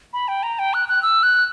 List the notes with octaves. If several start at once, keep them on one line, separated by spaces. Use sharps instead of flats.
B5
G5
A#5
G5
F#6
F#6
E6
F#6